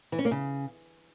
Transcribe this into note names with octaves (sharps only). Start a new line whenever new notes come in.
E3
C#4
A#3
C#3